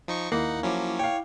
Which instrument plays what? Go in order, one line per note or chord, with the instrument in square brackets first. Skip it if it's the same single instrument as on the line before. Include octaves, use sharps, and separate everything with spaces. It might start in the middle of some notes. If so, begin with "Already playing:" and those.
[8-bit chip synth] F3 D#4 C#6
[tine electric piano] D#2 E4 [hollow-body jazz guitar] A#3 [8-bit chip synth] D#4 F#5
[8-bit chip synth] F3 F#3 C#4 [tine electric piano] E4 D6
[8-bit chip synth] C#5 [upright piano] F5 G5